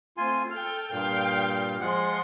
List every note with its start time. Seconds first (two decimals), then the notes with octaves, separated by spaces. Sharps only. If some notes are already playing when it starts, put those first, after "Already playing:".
0.17 A3 C4 F4 G#5 C6
0.51 A4 G5 F6
0.91 G2 A#2 F5 G5
1.81 F3 G#3 F#5 C6